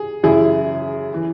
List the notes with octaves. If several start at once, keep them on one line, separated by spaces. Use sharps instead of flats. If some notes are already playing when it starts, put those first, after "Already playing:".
Already playing: G#4
F#2 C#3 E3 E4 G#4
E3